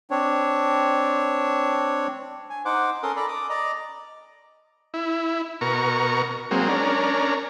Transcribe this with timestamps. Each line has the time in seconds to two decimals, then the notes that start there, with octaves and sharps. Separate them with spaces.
0.11 C4 D4 C#5
2.50 G#5
2.65 D#4 C5 F#5 D6
3.03 C#4 A4 A#4 C6 D#6
3.16 A4 D5 A#5 B5
3.28 D6 D#6
3.50 D5 D#5 A#5
4.94 E4
5.61 B2 A#4 C#6
6.51 F#3 G#3 A#3 C4
6.68 C#4 D4 A#4